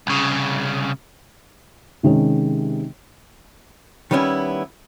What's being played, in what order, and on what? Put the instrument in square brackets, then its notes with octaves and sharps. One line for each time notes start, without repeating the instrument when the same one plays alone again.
[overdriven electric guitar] C2 C#3
[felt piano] C3 D#3 G#3 C#4
[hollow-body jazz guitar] D#3 G3 B3 C#4 E4